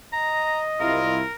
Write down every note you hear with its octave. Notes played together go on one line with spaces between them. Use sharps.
D#5 A#5
C2 E4 F4 A#4